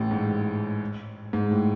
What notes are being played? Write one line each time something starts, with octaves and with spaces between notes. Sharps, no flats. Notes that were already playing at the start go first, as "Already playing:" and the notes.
Already playing: A1 A2
G#2
G#2
A2